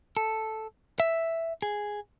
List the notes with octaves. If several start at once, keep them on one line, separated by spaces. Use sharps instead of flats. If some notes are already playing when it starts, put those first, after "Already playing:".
A4
E5
G#4